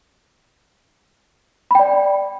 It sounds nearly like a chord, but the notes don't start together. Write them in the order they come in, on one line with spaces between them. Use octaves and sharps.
B5 G5 D5